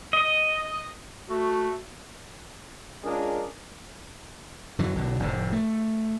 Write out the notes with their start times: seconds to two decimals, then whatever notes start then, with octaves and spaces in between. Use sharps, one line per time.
0.13 D#5
1.30 A3 F#4
3.03 G#3 C#4 D4 F4 G#4 A#4
4.79 F#2 D3 E3 F#3
4.95 B1 B2 D3
5.20 F1 A2 D3
5.53 A3